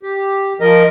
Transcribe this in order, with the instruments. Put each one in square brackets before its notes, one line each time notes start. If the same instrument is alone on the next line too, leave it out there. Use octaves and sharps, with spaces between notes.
[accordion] G4
F3 A#4 D#5